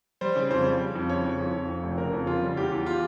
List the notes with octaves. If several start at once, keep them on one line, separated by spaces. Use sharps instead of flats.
G3 C5
C#3
F2 C5
G3
G3
F2
C#3 C#5
F2
F2
F2
F2
F1
C#3 A#4
F2
C#3 F4
G3
E2 G4
E2
F4